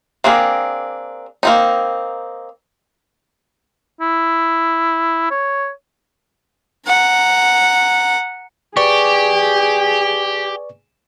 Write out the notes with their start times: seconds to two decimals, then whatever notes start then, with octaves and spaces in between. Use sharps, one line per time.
0.24 A#3 C4 D4 G#4 A#4
1.43 A#3 C4 D#4
4.01 E4
5.31 C#5
6.87 F#5 A#5
8.77 G4 G#4 B4 D5 C#6